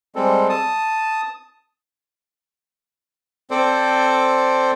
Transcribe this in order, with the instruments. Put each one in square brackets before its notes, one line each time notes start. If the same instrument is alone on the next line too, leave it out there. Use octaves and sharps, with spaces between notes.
[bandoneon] G3 G#3 C4 A4
A5 D#6
C4 A4 C5 D5